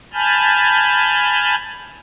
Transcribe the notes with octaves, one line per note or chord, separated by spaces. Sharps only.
G#5 A5 B5 F6 G6